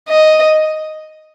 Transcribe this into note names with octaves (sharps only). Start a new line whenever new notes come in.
D#5